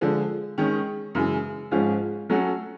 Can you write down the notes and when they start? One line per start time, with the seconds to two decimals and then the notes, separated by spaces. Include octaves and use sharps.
0.01 D3 F3 G#3
0.58 D#3 G#3 C#4
1.15 F#2 C#3 E3 G#3
1.71 G#2 F3 G#3 C#4 F4
2.30 F#3 A3 C#4 F#4 A4